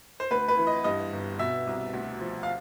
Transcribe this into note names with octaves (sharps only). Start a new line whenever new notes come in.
C5
D2 B4
B4
E3
D#5
G2 D#5
G1
B2 E5
C2
D2
F3
F5